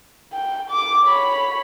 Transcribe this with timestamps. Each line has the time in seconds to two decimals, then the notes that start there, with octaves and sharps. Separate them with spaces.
0.33 G5
0.70 D6
1.04 C#5 B5